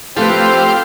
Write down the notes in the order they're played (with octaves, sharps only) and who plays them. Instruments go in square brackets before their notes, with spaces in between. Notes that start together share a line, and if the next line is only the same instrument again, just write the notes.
[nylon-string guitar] F3 A3 [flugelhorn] C4 [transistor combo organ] G4 C5 F5 [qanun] A4 B4